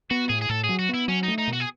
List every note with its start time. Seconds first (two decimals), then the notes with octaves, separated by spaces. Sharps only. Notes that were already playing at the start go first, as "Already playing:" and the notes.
0.10 B3 F#4
0.29 A2 G#4
0.42 G#4
0.49 A2 A4
0.64 G#4
0.69 F#3
0.79 F#4
0.89 B3 E4
1.08 F#3 C#4
1.23 D#4
1.28 A3
1.38 D#4
1.48 B2
1.53 F#4
1.60 G#4